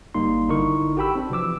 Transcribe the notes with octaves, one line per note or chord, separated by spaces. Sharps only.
G1 G2 G3 A#3 D#4 C6
G#1 D3 D#4 E4 A#4 C#6
F#4 G4 G5 B5 E6
C4 D4
C3 E3 F3 D6 E6